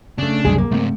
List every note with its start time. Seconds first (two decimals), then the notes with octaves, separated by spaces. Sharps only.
0.18 C#3 A3 D4
0.45 C2 F#2 C#3 G#3 G#4
0.58 A#3
0.71 C#2 G#2 A3 C4